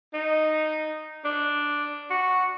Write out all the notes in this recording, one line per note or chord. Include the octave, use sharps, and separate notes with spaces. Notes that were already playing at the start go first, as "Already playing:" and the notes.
D#4
D4
F#4